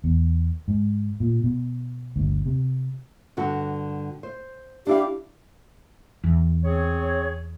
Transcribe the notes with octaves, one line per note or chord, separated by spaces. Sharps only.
E2
G#2
A#2
B2
G1 D2
C3
G2 D3 F#4
C5
D4 E4 G4 F5
E2
C4 G#4 C#5